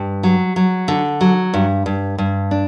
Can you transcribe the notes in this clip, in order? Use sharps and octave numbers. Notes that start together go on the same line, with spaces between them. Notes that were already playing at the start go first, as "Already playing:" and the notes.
Already playing: G2
F#3
F#3
D3
F#3
G2
G2
G2
D4